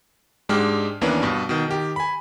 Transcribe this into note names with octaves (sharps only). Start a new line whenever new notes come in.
G#2 G#3 D4 G4 F6
D#2 E3 A#3 B3 C#4 D4
G2 B2
B2 D#3
D#3 G4
G#5 B5